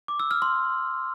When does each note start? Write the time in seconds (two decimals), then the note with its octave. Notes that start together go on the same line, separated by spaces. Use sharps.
0.08 D6
0.20 E6
0.31 F6
0.42 C6